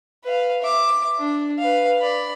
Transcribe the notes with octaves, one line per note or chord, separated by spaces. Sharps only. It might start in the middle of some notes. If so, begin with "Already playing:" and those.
B4 F5
E5 D6
D4
B4 F5
D5 B5